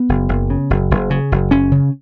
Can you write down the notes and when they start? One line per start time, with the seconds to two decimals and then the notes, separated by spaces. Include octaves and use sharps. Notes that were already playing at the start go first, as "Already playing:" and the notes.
Already playing: B3
0.09 F#1
0.29 F#1
0.50 C#3
0.70 F#1
0.91 F#1
1.10 C#3
1.32 F#1
1.51 F#1 C#4
1.72 C#3